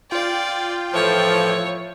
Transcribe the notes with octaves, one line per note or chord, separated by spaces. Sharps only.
F4 D5 G5
A2 E3 F3 C#5